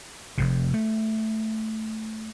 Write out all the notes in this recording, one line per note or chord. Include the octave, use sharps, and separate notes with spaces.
F1 F2 C3
A3